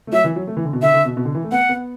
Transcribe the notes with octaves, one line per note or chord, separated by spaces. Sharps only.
A3
F#3 E5
E3
F#3
A3
E3
D3
B2
D3 E5
D3
B2
B2
D3
E3
A3
B3 F#5
B3